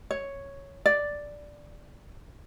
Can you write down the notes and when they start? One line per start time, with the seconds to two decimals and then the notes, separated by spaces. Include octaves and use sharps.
0.11 C#5
0.86 D5